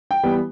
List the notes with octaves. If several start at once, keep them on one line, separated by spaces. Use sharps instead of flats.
G5
E3 G3 B3